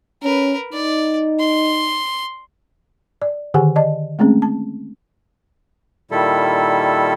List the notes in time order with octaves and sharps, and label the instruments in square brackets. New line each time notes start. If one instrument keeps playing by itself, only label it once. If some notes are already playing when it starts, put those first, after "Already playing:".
[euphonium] C#4 [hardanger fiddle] A#4 B4
[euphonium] D#4 [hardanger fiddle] D5
[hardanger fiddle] C6
[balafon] D5
D3 D#3 G4 G#4 F#5 G#5
D5 D#5 A5
G#3 A3 C4 C#4 G#4
A5
[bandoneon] A#2 D#3 G3 E4 A4